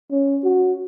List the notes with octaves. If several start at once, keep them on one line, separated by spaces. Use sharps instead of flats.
C#4
F#4